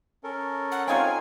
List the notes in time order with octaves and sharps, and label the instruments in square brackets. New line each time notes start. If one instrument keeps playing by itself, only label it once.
[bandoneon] C#4 A4 A#4
[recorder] F#5
[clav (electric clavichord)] C4 D#4 F4 [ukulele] C#5 F5 G5 [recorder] G#5